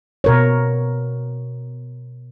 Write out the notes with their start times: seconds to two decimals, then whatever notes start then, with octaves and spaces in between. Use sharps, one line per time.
0.24 B2 A#4 C#5